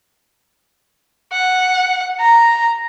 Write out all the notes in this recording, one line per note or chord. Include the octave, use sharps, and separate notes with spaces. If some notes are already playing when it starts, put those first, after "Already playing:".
F#5
A#5